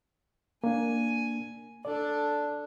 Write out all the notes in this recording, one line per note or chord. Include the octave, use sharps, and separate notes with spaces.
A#3 D4 G#5
D4 A4 D5